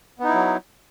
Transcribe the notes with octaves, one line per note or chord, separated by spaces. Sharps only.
F#3 B3 D#4 E4